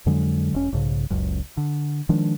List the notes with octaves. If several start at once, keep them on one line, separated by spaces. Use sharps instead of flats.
F2 D3 F#3 G#3
E1 C#4
B1 G#2 C#3
F#1 C#2 F#2
D3
D#3 F3 G#3 D4